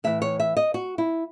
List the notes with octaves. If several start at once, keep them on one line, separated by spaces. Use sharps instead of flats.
A2 E3 E5
C#5
E5
D#5
F#4
E4